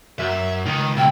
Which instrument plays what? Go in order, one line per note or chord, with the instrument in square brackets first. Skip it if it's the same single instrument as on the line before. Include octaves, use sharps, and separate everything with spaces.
[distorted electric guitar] F#2 [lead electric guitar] E5
[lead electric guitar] C#2 [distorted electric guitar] D#3
[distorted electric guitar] B1 E4 [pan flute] G5